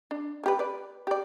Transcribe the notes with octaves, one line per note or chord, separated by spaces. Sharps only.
D4
A#3 G4 B4
B4 D5
G4 D5